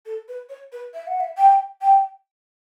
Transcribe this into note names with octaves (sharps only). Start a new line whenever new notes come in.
A4
B4
C#5
B4
E5
F#5
E5
G5
G5